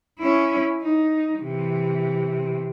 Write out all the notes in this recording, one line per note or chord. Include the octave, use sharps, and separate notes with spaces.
C#4 E4
D#4
C3 E3